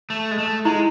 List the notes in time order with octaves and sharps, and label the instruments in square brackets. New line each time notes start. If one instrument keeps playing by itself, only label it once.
[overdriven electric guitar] A3
G#3
A3
[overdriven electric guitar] G#3 [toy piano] E4